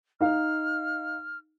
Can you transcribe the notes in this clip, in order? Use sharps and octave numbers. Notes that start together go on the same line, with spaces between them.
D#4 F5 F6